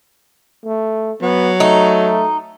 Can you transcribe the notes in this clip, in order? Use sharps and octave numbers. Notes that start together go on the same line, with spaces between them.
A3
F#3 B3
A3 D#4